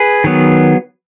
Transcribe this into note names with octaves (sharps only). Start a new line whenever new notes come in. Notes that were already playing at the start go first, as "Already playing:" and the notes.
Already playing: G#4 B4
D#3 F#3 B3